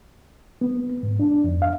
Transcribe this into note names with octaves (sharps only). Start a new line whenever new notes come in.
B3
G#2
D4
F2
F5